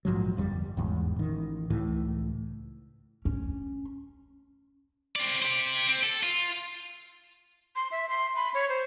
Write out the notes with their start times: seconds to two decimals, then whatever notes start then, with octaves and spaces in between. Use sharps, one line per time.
0.05 A#1 G#2 F3 F#3
0.37 G1 F2 G3
0.77 A1 E2 G#2
1.16 A1 D#3
1.70 C#2 A2 E3
3.25 C#4
5.16 C4 D5
5.42 G4 C5
5.87 C4
6.03 A4
6.23 F4
7.76 C6
7.92 E5
8.09 C6
8.36 B5
8.54 C#5
8.69 C5